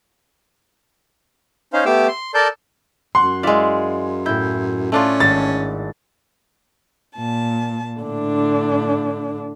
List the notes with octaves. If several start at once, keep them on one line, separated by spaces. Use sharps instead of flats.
C#4 D#4 C5 F5
A3 B3 G4 D6 E6
C6
A4 A#4 D5 A5 G6
F#2 F#5 C6
G#3 E4 D5 F5
A2 E4 G6
A3 C#4 D4 F4
G#1 A6
A#2 A5
A2 D3 D4